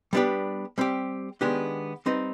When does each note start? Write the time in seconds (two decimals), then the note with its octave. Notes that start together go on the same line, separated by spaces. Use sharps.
0.13 G3 B3 D4 G4 B4
0.78 G3 C4 G4
1.41 D#3 G#3 B3 D4 G4
2.06 G3 C4 D#4 B4